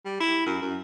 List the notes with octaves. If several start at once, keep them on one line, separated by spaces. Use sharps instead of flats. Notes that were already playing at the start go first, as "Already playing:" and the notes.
G3
E4
F#2
F#2